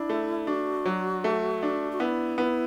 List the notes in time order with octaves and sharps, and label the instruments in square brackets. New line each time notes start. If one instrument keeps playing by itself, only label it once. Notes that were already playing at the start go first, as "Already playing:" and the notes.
Already playing: [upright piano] D4 [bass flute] E4
[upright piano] A3
[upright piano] D4 [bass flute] F#4
[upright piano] F#3
A3
D4
[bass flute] F#4
[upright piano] B3 [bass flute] E4
[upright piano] B3